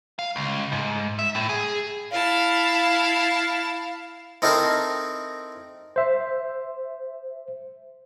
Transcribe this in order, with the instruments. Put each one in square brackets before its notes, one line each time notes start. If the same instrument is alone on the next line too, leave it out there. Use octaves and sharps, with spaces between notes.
[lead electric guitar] F5
C#2
G#2
E5
A2
G#4
[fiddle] E4 A5 [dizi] F5
[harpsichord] C4 D#4 E4 A4 A#4 C5
[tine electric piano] C5 E5